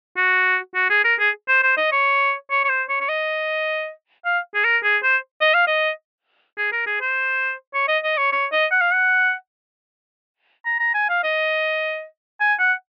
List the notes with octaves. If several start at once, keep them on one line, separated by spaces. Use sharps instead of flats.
F#4
F#4
G#4
A#4
G#4
C5
C5
D#5
C#5
C#5
C#5
C5
C#5
C#5
D#5
F5
G#4
A#4
G#4
C5
D#5
F5
D#5
G#4
A#4
G#4
C5
C#5
D#5
D#5
C#5
C#5
D#5
F#5
F5
F#5
A#5
A#5
G#5
F5
D#5
G#5
F#5